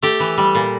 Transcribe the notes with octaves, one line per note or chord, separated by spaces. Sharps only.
A3 G4
E3
G3
A#2